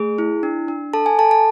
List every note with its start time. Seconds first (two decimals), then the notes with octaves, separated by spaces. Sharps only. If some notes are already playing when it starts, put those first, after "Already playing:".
Already playing: A3 G#4
0.18 E4
0.43 D4
0.68 D4
0.93 A4 A5
1.06 G#5
1.19 A4 A5
1.31 A5